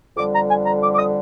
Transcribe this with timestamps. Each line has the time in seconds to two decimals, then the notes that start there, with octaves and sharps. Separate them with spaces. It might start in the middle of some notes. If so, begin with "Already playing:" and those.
0.17 F2 D3 G3 D6
0.35 A#5
0.50 G#5
0.66 A#5
0.82 D6
0.94 D6
0.98 D#6